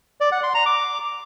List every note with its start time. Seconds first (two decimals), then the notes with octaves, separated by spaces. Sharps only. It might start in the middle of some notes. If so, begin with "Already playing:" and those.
0.21 D5
0.32 F#5
0.43 C6
0.55 A#5
0.66 D6